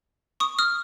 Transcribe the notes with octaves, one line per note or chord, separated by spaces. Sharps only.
C#6 D#6
D#6 F6